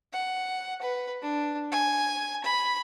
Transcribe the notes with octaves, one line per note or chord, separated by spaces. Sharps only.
F#5
B4
D4
G#5
B5